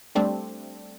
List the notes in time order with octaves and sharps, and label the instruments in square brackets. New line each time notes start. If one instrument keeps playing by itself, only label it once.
[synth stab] G3 A3 C4 D4